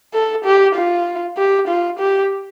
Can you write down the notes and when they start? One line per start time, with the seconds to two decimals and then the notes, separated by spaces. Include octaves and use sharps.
0.13 A4
0.45 G4
0.75 F4
1.37 G4
1.68 F4
2.00 G4